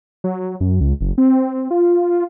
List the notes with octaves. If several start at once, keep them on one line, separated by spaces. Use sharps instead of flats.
F#3
F#2
C#2
F#1
C4
F4